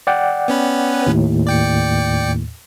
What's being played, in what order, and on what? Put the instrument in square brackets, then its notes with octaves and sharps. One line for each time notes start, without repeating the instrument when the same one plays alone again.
[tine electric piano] D5 F#5 G5
[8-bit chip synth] B3 C#4 B4
[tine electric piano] D#2 A2
[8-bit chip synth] D5 G5 C#7